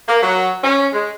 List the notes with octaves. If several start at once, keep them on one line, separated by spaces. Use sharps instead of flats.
A#3
F#3
C#4
G#3